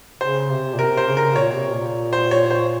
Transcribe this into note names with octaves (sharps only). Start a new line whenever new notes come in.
C#3 C5
C3
A#2
C3 A#4
C5
C#3
A#4
A#2 C#5
C3
A#2
C5
C#5
C5